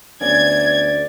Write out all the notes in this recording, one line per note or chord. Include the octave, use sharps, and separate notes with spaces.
D2 B3 C#4 D5 G#6